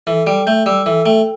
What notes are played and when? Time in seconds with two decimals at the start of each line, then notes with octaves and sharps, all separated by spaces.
0.07 E3 A4
0.27 G3 G5
0.47 A3 G6
0.66 G3 E6
0.86 E3 A4
1.06 A3 G5